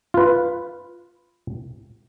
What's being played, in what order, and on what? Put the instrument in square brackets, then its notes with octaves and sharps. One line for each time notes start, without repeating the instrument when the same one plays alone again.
[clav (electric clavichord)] F4 B4